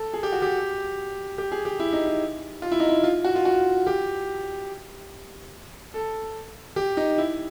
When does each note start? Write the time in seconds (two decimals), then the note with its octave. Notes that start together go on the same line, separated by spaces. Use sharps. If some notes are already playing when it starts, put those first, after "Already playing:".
Already playing: A4
0.14 G#4
0.23 G4
0.32 F#4
0.42 G4
1.38 G4
1.52 G#4
1.65 G4
1.80 E4
1.93 D#4
2.06 E4
2.62 F4
2.71 E4
2.80 D#4
2.89 E4
3.04 F4
3.24 F#4
3.35 F4
3.45 F#4
3.87 G4
5.94 A4
6.76 G4
6.97 D#4
7.18 E4